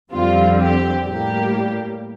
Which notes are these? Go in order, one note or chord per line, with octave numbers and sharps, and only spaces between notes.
F2 D3 G3 C4 F4
G4
A2 G3 A#3 G4